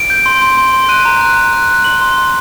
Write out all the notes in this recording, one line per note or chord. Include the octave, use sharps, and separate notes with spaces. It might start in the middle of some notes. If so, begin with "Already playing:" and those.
Already playing: D7
G6
C6
C6
C6
C6
F#6 D#7
A#5
F#6
A#5
F#6
F#6
C6 F#7
C6
C6